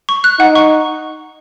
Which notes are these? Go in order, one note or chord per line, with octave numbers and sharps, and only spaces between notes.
C#6
F#6
D#4 F#5
C#6